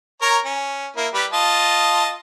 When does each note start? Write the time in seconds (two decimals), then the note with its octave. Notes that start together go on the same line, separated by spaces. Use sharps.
0.22 A#4 C#5 A#5
0.45 C#4
0.96 A#3 E4
1.14 G3 G4 B4
1.32 F4 D#5 A5